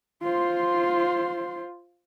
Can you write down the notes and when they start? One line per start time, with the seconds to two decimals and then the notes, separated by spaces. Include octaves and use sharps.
0.22 F4 C5